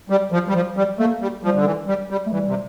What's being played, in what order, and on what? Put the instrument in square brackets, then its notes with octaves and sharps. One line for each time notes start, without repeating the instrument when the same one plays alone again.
[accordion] G3
F3
G3
F3
G3
[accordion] A3 [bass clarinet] A#3
[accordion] G3
[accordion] F3 [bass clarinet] G3
[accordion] D3
E3
G3
G3
[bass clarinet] A3
[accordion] E3 [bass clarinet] G3
[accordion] C3